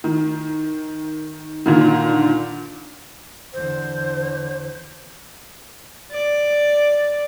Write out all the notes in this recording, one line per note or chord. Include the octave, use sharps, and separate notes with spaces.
D#3
A#2 D3 D#3
E2 D3 C5
D5